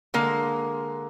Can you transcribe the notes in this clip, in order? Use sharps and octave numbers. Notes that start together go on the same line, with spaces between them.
D3 G#3 A#3